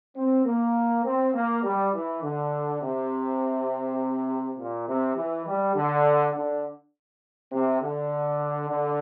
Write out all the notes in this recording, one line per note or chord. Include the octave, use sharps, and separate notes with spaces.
C4
A#3
C4
A#3
G3
E3
D3
C3
A#2
C3
E3
G3
D3
D3
C3
D3
D3